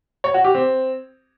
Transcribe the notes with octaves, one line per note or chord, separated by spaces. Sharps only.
C#5
F#4
G4
C4